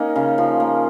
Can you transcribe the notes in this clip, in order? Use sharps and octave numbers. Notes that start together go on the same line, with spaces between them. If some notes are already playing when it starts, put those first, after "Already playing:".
Already playing: A#3 C#4 D#4
C#3
F3
A#3